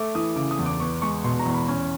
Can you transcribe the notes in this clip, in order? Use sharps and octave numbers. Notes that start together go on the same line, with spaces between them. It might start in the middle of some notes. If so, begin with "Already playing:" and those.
Already playing: A3 D6
E3 D#6
C#3 D6
D#6
E2
D6
B3 C#6
G#3 C#6
B2 C6
A#5
E2
B5
C#4